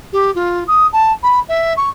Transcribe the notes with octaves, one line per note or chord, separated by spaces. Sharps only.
G4
F4
D#6
A5
B5
E5
C#6